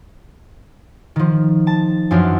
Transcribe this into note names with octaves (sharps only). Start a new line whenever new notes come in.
D#3 F3
A5
F#2 E3 F3 D4 F4